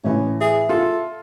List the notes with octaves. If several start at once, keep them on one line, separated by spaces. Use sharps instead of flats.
A2 E3 C#4
G#4 E5
F4 A4